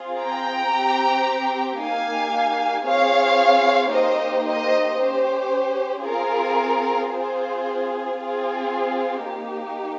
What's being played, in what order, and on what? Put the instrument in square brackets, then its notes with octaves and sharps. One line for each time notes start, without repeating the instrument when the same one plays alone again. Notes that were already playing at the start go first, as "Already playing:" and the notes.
Already playing: [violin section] C4 F4 G#4
G5 A#5
C4 G4
A#3 D#4 G4 F5 G#5
C4 F4 G#4 C#5 F5
A#3 D#4 G4 C5 D#5
C5 D#5
C#4 G4 C5
C4 F4 G#4 A#4
C4 F4 G#4 C5
C4 F4 G#4
A#3 D#4 G4